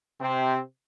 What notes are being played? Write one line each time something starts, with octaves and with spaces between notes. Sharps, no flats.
C3 C4